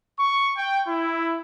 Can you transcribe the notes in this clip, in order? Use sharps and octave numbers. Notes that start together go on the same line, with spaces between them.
C#6
G5
E4